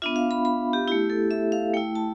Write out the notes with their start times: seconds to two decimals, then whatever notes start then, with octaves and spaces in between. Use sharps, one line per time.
0.02 B3 D4 F4 E5
0.16 F5
0.31 B5
0.45 B5
0.73 G4
0.88 E4 G4
0.92 A3
1.10 A4
1.31 E5
1.52 F5
1.74 A3 G5
1.77 E4
1.95 A5